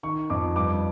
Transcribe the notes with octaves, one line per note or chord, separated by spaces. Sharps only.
D#3 C#6
F2 D6
G2 D6